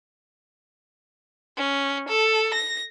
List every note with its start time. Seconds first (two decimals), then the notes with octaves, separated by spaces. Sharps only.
1.57 C#4
2.09 A4
2.54 A#6